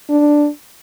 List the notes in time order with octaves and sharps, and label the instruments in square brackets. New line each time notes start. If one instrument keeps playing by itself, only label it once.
[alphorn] D4